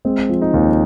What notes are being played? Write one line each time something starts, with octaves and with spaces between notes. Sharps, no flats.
G#3 C4
F3
D#4
D#2